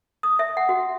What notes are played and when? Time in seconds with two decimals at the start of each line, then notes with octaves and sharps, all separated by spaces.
0.23 D#6
0.39 E5
0.57 F#5
0.69 F#4